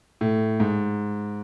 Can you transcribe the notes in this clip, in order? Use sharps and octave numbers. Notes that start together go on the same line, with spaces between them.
A2
G#2